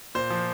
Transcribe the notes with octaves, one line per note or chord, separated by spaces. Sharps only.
A#2 C5
F3